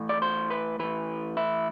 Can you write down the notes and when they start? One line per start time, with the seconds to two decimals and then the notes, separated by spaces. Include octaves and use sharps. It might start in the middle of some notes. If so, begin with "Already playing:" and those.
Already playing: A2 E3
0.09 D5
0.22 C5
0.50 B4
0.79 A2 E3 B4
1.37 E4